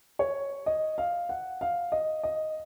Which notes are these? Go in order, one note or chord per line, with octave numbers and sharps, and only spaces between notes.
C#5
D#5
F5
F#5
F5
D#5
D#5